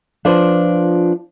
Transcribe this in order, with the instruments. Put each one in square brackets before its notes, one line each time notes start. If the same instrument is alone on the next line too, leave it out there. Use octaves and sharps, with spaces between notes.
[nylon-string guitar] F3 D4 F4 B4 C5